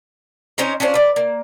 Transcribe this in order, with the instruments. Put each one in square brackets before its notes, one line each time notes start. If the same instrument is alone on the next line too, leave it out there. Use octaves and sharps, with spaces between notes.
[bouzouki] C#4 D#4 A#4 C5
C#4 D4 F4 C5
B4 D5
A#3